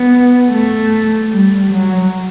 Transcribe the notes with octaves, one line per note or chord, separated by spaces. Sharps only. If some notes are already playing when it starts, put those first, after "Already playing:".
Already playing: B3
A3
G3
F#3